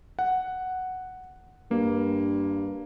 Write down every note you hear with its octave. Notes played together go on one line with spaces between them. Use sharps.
F#5
G2 A#3